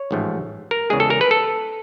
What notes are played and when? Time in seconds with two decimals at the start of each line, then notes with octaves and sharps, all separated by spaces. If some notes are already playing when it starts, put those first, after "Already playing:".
Already playing: C#5
0.11 A1 G#2 F3 A3
0.71 A#4
0.90 E2 C#3 E3 G#3 G#4
1.00 A4
1.10 A#4
1.21 B4
1.31 A4